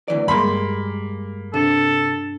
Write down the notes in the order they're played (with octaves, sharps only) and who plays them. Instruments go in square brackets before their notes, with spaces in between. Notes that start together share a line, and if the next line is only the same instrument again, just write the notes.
[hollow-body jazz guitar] D2 E3 D5
[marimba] G2 C6 [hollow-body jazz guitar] G3 G#3 [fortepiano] A#3 B5
[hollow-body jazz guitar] C3 [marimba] D4 [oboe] A4